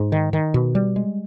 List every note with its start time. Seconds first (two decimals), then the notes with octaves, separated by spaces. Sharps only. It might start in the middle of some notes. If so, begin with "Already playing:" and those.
Already playing: G#2
0.12 D#3
0.33 D#3
0.54 B2
0.75 G3
0.96 G#3